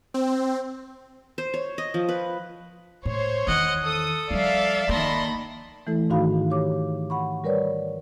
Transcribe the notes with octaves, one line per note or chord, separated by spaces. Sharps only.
C4
C5
C#5
D#5
F3
B4
A2 C5 C#5
E2 D#3 D#5 F#5
A4 D#6
F3 G3 D5 E5 F5
D#3 A#3 A5 B5 C6 A#6
E3 A3 E4 A4
G#2 D#3 D#4 F#4 F5 B5
G4 C#5 D6
F#5 B5 C#6
G3 A#4 B4 C#5 D5